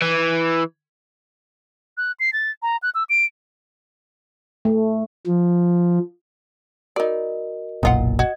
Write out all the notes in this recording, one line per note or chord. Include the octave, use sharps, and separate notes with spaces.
E3
F#6
C7
A6
A#5
F#6
E6
D7
A3
F3
D#4 F#4 A#4 D5 D#5
F#1 B1 A#2 D#4 F4 F#5
F#4 D#5 G#6